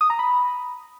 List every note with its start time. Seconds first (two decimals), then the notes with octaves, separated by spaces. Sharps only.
0.01 D#6
0.10 A#5
0.19 B5